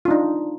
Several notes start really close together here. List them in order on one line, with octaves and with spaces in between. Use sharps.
F4 D4 D#4